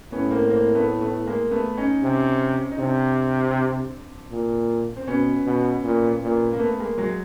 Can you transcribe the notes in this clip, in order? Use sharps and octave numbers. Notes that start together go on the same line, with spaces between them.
A2 B3 C#4
A#3 C4
A#3 C4
A3 B3
A3 B3
G#3 A#3
A3 B3
C#4 D#4
C3
D#4
C3 C4 D4
A#2
C4
B2 B3 C#4
B2
A#2
A#2
A#3
A3 B3
G#3 A#3
F#3 G#3